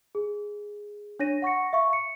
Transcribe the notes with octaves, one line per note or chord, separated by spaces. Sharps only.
G#4
D4 C#5 A#6 D#7
F#5 C#6 A#6 C#7
E5 F5 C#6
C#7